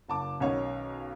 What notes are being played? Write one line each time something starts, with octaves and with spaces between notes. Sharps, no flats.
F#1 A5 D6
B1 D#3 C#4 C#5 F5